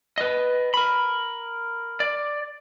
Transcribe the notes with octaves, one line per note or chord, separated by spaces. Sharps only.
B4 D#5
A#4 B5
D5